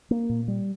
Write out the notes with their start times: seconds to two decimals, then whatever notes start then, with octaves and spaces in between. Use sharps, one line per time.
0.11 A#3
0.29 A#2
0.48 G3